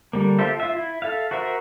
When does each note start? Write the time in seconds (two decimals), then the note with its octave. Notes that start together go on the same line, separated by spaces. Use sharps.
0.13 D3 G3 A#3
0.39 F4 G4 A4 C5 E5
0.60 F4 E5
0.77 E4
1.02 A4 E5 F5
1.31 F#4 A#4 C5 E5